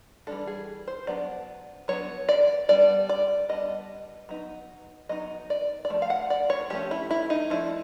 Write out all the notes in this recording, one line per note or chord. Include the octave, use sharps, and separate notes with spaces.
E3 G3 A#3 D4 A4
G#4
C5
F#3 B3 D4 D5
F#3 B3 D4 C#5
D5
G3 B3 D4 D5
D5
G3 B3 D4 D#5
F#3 B3 D#4
F#3 B3 D#4 D#5
D5
D5
F3 A3
F5
F#5
D5
C#5
F3 A3 C#4 G4
E4
E4
D#4
F3 A3 D4 E4